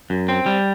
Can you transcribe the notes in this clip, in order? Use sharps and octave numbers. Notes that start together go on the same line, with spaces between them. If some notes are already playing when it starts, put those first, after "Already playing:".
F#2
C4
G3